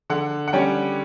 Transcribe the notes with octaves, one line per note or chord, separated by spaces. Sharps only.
D3 F#5
F#5
G3 C#4 G5